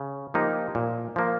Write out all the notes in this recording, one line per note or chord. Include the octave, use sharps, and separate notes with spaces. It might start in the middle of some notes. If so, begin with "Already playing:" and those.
Already playing: C#3
F3 A#3 D#4 G4
A#2
F3 A#3